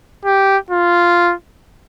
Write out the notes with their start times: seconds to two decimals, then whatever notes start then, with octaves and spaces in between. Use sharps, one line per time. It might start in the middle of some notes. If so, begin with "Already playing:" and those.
0.26 G4
0.70 F4